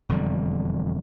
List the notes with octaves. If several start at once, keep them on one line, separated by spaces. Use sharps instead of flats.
E1 F2 D3 G3